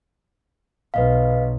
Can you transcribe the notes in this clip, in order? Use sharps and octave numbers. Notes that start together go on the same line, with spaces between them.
B1 B4 D#5 F5